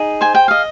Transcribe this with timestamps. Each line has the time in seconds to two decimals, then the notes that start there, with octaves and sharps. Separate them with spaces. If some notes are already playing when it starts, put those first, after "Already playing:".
Already playing: D#4 G#4
0.21 C5 G#5
0.35 G5
0.48 D#5 F5